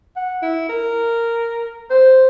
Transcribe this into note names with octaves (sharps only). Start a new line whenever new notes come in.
F#5
E4
A#4
C5